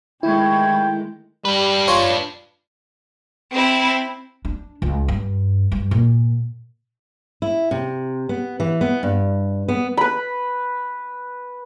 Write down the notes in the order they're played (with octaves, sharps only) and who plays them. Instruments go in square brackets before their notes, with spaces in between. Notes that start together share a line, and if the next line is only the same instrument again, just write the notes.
[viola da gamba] D#3 G#3 A3 [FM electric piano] E4 [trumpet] G5 [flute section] B5 C#6 G#6
[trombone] G3 [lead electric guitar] D4 B4
[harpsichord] F4 C#5
[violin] C4 E4
[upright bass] D4
C#2
G2
G2
A#2
[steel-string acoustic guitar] E4
C3
B3
E3
B3
G2
B3
[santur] B4 B5